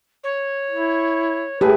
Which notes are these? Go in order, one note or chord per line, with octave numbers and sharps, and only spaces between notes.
C#5
E4
A2 G4 G#4 B4 A5